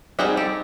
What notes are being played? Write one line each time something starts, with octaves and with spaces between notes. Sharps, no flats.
G3 C4 D#4 F#4 G#4
G4 A4